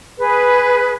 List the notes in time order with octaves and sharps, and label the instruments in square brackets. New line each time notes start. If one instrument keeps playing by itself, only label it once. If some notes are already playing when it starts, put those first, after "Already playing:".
[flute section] G#4 B4